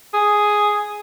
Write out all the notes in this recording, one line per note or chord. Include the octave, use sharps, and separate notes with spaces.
G#4